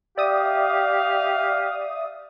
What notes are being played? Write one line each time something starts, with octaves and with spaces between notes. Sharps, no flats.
G4 D5 E5 F5 D#6